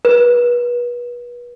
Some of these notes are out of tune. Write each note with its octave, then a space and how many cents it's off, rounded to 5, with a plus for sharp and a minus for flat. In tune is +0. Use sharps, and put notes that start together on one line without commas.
B4 -35